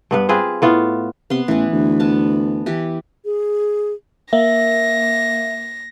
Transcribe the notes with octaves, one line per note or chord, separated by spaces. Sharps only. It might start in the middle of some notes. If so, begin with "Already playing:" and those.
G2 B3 B4
C4 F4 G#4 B4
A2 B3 F4
C3 B3 C6
A1 E3 B3
D2
B3 A5
E3 G4
G#4
A#3 E5 A#6